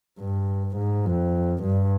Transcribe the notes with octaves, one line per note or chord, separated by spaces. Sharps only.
G2
G#2
F2
G2